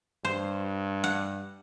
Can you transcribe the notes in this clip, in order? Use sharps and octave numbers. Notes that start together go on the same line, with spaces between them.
G2 C5
F#5